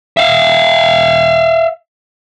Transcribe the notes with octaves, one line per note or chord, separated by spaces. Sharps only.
E5 F5